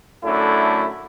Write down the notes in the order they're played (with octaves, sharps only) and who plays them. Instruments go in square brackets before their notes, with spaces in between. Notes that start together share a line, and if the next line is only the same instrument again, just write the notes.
[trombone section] F#2 D3 A3 E4